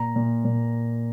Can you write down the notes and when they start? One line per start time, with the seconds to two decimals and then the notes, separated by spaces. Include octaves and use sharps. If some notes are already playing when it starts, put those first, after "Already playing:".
Already playing: A#2 A#5
0.16 A#2
0.45 A#2